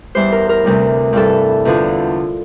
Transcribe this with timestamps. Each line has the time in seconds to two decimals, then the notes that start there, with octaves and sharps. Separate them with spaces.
0.15 E2 E3 G3 C5
0.32 A#4
0.49 A#4
0.65 D2 C3 E3 G3
1.13 G2 E3 G3 A4
1.65 E2 D3 F3